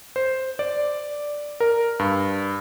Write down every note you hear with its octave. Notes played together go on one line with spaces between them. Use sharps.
C5
D5
A#4
G2